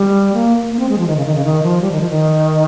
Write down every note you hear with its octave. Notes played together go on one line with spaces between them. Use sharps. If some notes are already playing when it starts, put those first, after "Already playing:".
Already playing: G3
A#3
A#3
C4
G#3
F3
D#3
C#3
D#3
C#3
D#3
F3
G3
D#3
F3
D#3